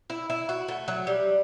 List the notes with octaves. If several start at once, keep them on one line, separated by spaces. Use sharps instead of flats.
E4
E4
F#4
A3
F#3
G3